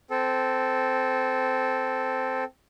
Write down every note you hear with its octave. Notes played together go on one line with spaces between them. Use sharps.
C4 A4